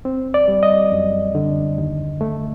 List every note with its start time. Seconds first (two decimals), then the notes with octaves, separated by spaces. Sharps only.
0.05 C4
0.34 D5
0.48 G3
0.63 D#5
0.92 F#2
1.35 D3
1.78 D#2
2.21 A3